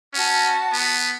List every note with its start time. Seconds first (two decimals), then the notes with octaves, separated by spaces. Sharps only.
0.14 C#4 F#4 A5
0.73 B3